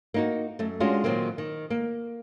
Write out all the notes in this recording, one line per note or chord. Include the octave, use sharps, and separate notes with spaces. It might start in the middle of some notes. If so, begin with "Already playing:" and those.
A#3 D#4 F#4
F#2 A3
G#3 C#4 D4 F4 F#4 G#4
A#2 D#3 F#3 A#3 C4
D#3
A#3